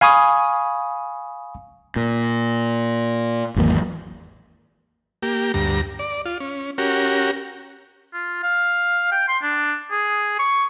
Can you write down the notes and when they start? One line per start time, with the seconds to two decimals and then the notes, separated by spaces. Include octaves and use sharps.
0.01 F5 G#5 B5 C#6 D#6
1.96 A#2
3.56 G#1 E2 F#3 A#3
5.23 A#3 G4
5.54 D2 G2 A#5
5.99 D5
6.26 F4
6.40 C#4
6.78 C#4 F#4 G4 A#4
8.13 F4
8.43 F5
9.12 G5
9.28 C6
9.43 D4
9.91 G#4
10.39 C#6